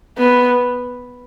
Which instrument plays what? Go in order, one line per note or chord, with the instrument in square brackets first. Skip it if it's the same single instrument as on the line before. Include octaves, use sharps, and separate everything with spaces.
[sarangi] B3